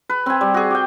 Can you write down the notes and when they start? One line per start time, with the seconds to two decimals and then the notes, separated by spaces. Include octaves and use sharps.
0.09 B4
0.26 C4 G#5
0.41 G3
0.54 F#4 G#4
0.70 G4 G5